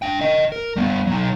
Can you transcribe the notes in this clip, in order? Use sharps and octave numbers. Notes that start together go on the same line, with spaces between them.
D4 G5
D#5 G5
A#4
G3 B3
F#3 D#4